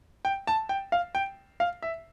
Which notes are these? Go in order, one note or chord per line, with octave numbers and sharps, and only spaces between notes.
G5
A5
G5
F5
G5
F5
E5